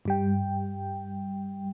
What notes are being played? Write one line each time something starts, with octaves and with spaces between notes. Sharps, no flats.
G2 G3 G5